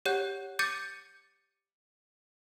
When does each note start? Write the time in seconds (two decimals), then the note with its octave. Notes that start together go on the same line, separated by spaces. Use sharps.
0.06 G4 C#5 F#5 F#6 G6
0.59 D6 G6 A6 C#7 D#7